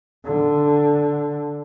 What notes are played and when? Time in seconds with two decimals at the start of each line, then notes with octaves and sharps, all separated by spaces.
0.25 D3